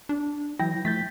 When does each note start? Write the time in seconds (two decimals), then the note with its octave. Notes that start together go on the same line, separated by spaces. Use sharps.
0.09 D4
0.59 E3 F#3 E4 G5 A#6
0.85 F3 A3 G6 A6 B6